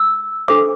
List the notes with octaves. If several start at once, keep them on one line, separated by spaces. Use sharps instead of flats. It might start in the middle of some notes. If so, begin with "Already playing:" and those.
Already playing: E6
D4 A4 C5 D6